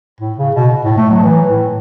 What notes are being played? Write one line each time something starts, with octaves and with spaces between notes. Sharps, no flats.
A2
C#3
B2
A2
A3
F#3
E3
A2